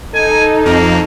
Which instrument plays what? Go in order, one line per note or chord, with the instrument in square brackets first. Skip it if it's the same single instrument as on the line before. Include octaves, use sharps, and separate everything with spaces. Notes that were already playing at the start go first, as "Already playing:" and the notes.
[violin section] D#4 [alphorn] A4 [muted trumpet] G#5
[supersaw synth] F2 [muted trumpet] A#3